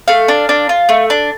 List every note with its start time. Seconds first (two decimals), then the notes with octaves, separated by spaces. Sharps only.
0.08 A3 F5
0.28 D4
0.49 D4
0.69 F4
0.89 A3
1.10 D4